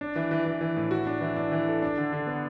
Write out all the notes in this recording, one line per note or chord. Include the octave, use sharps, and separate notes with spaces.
D4
E3
E3
E3
E3
A2
F#4
D4
E3
D4
E3
A4
D4
D3
D3
B3